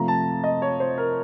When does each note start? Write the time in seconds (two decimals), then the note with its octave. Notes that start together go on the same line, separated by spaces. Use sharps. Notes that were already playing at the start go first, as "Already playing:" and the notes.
Already playing: C3 F3 A3 A#5
0.08 A5
0.44 D#5
0.62 C#5
0.80 C5
0.98 A#4